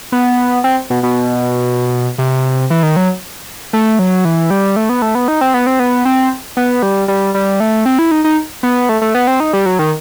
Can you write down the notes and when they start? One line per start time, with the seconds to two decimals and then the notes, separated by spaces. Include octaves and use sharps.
0.12 B3
0.64 C4
0.90 B2
1.03 B2
2.18 C3
2.70 E3
2.83 D#3
2.96 F#3
3.73 A3
3.99 F#3
4.25 E3
4.50 G3
4.76 A3
4.89 B3
5.02 A3
5.15 B3
5.28 D#4
5.41 C4
5.54 B3
5.67 C4
5.79 B3
6.05 C4
6.57 B3
6.83 G3
7.08 G3
7.34 G3
7.60 A3
7.86 C4
7.99 E4
8.11 D#4
8.24 D#4
8.63 B3
8.89 A3
9.02 A3
9.15 B3
9.27 C4
9.40 D#4
9.53 G3
9.66 F#3
9.79 D#3